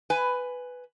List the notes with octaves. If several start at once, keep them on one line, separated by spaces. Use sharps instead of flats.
B4 G#5